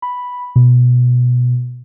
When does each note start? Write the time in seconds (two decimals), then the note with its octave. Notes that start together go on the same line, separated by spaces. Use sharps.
0.02 B5
0.56 B2